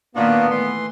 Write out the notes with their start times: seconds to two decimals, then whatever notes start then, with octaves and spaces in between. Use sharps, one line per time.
0.16 A#2 D#3 A#3 B3 D4 F4 F#4
0.51 E3 A3 C6